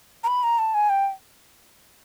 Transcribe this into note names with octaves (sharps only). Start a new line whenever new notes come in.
A#5
B5
A#5
A5
G#5
G5